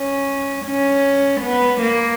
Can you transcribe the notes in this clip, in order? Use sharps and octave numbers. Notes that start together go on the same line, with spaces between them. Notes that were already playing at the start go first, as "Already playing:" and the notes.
Already playing: C#4
C#4
B3
A#3